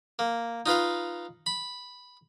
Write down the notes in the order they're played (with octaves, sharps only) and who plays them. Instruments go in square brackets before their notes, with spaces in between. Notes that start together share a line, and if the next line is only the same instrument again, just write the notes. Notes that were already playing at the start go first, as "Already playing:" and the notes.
[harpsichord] A#3
D#4 F4 B4 F5
B5